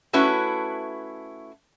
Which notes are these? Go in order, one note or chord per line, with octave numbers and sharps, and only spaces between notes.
A3 C#4 E4 F#4 B4